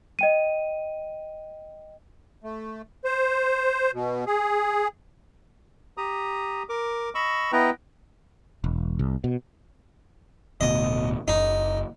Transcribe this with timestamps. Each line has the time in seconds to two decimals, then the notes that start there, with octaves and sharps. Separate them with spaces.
0.19 D#5 G5 D#7
2.44 A3
3.04 C5
3.94 B2
4.27 G#4
5.98 G4 A#5 D#6
6.69 A#4 D6
7.15 D#5 B5 C#6 E6
7.52 B3 E4 B4 D#5 G5 A#5
8.64 E1
8.99 C2
9.24 B2
10.61 D1 D2 B2 D#5
11.28 F#1 D#4